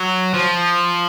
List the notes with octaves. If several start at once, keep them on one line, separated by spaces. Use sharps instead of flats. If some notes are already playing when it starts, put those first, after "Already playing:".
Already playing: F#3
F3